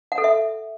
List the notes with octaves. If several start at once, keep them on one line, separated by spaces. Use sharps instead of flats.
F#5
A4
E5